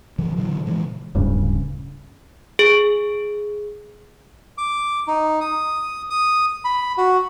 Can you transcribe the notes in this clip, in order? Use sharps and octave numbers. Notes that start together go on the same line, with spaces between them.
C#3 E3 F3
A#2 D3 E3 F#3
A#2 C#3 E3 G#3
D1 G2 C#3
G#4
D6
D#4
D#6
D#6
B5
F#4